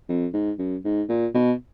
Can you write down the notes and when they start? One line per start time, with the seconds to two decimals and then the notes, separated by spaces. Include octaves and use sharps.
0.09 F2
0.34 G#2
0.59 F#2
0.85 G#2
1.09 A#2
1.34 B2